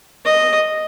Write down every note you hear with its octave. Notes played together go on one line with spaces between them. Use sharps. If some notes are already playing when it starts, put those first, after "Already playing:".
D#5